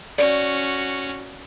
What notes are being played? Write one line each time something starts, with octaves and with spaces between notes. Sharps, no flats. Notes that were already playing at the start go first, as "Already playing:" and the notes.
C#4 F#4 D5